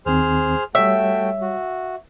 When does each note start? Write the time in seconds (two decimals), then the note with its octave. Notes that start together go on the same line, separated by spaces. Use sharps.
0.06 D#2 D#3 C4 G#4 C5 F6
0.75 G3 A3 F#4 C#5 E5 G5
1.41 F#4